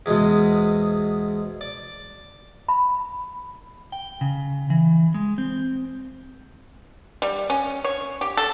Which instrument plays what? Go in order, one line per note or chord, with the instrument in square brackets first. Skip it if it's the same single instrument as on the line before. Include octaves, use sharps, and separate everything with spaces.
[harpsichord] E2 G#2 B2 G#3
D5
[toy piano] B5
[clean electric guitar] G5
C#3
E3
G#3
C4
[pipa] G3
C#4
C#5
G4
A4